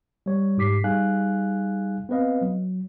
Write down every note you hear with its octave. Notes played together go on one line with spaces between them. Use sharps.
G3 C#5
G#2 G4 D6 B6 C7
G3 D#4 G#4 F5 G#5 F#6
B3 C4 B4 D#5 F5
F#3